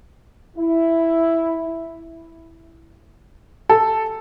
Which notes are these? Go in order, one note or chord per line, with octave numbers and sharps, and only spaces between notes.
E4
A4